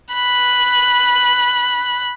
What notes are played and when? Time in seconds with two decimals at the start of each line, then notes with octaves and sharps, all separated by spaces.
0.14 B5 F#6